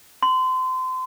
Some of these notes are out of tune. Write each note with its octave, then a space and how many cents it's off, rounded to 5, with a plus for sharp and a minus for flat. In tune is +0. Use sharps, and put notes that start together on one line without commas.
C6 -30